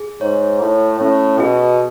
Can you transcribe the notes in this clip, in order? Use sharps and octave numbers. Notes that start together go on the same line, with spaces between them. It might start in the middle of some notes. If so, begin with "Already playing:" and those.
Already playing: G#4
G#2 C#5
A2 C#5
A2 C#4
B2 G#4